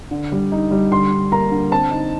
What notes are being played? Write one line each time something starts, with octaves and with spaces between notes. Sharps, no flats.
D3
G3
D#4
G3
D3 C6
D4
A#3 A#5
D3
C4 A5
D#4